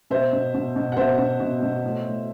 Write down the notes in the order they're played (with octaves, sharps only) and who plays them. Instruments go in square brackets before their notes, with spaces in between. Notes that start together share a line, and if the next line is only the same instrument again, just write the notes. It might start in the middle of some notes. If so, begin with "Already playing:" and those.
[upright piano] B2 C5 E5
B2
B2
B2
F#5
B2 C5 E5
B2
B2
B2
A2
A2